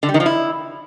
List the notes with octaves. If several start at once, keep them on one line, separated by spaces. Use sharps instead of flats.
D3
G3
D#3
F3
E4